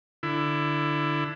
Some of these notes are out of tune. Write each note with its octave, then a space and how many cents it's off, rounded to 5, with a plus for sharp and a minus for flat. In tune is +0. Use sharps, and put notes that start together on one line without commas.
D3 +10 E4 +20